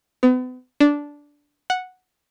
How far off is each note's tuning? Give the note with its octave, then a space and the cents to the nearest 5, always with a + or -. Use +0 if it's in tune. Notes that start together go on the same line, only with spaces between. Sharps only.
B3 +40
D4 -10
F#5 -5